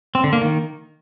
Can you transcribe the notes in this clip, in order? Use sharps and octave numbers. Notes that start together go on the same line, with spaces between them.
C4
D3
A#3
D#3